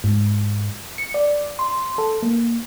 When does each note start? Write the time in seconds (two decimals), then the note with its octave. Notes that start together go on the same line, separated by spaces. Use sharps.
0.04 G#2
0.98 C#7
1.14 D5
1.59 C6
1.98 A4
2.23 A#3